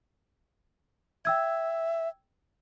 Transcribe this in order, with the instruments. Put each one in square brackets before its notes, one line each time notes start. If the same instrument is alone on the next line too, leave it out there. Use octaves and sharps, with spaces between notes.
[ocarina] E5 [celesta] G5 E6 G#6